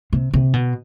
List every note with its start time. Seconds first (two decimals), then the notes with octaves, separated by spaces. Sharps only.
0.13 C3
0.34 C3
0.53 B2